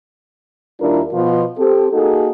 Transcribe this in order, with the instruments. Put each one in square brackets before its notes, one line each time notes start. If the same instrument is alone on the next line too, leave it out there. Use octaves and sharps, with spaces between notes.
[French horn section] D#2 G3 D4 E4 F4 A#4
B2 F3 F4
C4 G4 A4
A#3 D#4 F#4 G#4 A4